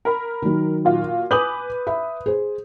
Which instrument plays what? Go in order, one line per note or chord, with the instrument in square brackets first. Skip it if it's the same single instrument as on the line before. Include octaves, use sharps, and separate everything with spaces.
[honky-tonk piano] A#4 B5
[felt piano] D#3 F#3
[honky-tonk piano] A#2 F4 F#4
[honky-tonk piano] B4 D6 F#7 [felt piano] G#5 D#6 G6
[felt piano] E5 B5
G#4 C5